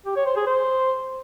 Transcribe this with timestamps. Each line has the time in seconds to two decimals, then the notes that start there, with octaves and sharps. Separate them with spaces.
0.06 G4
0.16 C#5
0.26 C5
0.37 G#4
0.47 C5